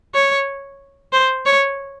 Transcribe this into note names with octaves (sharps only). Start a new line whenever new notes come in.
C#5
C5
C#5